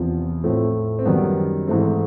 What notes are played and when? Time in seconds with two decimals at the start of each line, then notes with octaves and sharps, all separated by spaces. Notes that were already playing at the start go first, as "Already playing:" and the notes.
Already playing: E2 C3 F3
0.44 A2 F3 A3 C4
0.99 C4
1.05 F#2 D#3 G3 B3
1.67 G#2 E3 A3 C4